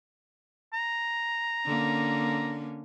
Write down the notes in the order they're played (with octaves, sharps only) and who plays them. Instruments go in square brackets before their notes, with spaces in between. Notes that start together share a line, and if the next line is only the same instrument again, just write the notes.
[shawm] A#5
[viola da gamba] D3 A#3 C#4